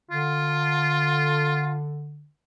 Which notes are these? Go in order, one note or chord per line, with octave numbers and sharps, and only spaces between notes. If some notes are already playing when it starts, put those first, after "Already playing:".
D3 F4